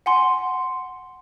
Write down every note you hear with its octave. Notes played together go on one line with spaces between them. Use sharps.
F#5 G#5 C6